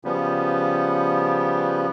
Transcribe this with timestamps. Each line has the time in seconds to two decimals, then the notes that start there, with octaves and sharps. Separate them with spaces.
0.05 C#3 F3 G3 B3